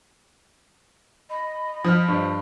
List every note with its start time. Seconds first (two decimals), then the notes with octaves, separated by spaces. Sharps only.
1.30 D#5 B5
1.84 F3 D#6 F6
2.08 G2